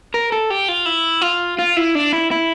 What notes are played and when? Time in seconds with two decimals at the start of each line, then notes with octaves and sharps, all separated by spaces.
0.14 A#4
0.32 A4
0.50 G4
0.68 F4
0.86 E4
1.22 F4
1.59 F4
1.76 E4
1.95 D4
2.13 E4
2.31 E4